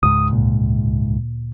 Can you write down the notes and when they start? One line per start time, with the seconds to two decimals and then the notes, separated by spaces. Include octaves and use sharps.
0.03 C#2 G#2 D#6
0.31 D2 A#2